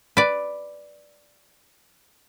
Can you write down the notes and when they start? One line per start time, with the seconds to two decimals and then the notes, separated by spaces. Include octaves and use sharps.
0.17 B4 D5